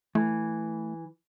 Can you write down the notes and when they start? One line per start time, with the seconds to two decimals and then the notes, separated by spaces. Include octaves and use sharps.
0.15 E3 A3